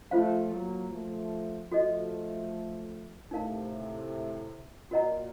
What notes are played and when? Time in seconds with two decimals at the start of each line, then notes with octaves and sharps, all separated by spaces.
0.11 F3 A3 F4 C5 F5
0.52 F#3 A#3
0.91 F3 A3
1.71 F3 A3 F#4 A4 D#5
3.31 A2 C3 D#4 A#4 F5 A5
4.91 A#2 F#4 A#4 D#5 F#5 A#5